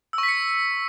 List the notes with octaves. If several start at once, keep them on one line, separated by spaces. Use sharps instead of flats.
E6
C#6
B6
C#7